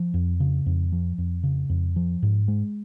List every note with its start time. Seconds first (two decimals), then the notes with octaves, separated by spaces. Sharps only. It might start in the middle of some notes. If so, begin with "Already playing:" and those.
Already playing: F3
0.14 F2
0.40 C#3
0.66 F2
0.92 F3
1.18 F2
1.44 C#3
1.70 F2
1.96 F3
2.23 G#2
2.48 G#3